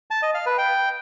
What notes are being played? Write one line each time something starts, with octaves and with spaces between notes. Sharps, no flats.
A5
D#5
F5
B4
G5